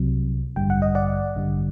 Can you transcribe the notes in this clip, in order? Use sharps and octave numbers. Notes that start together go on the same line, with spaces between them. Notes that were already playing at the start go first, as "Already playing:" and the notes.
Already playing: C2 C3 F#3
A1 G2 D3 G3 G5
F#5
D#5
D5 F#5
A1 G2 D3 G3